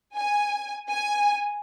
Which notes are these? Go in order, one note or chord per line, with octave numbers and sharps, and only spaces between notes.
G#5
G#5